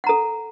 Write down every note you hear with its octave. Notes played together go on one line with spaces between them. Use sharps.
A4 F#5 A#5